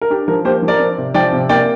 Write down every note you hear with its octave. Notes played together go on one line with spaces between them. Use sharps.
A#4
D4 G4
F3 A#4
A#3 G4 C5
F3
A#4 D5
C4
C3
F3 D5 G5
C3
A#3 D5 G5